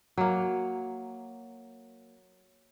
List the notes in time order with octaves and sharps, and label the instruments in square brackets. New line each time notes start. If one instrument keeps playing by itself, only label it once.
[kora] F#3 A#3